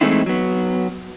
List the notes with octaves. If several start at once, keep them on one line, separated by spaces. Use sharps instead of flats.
E3 G#3 A3 C4 D#4 E4
F#3 B3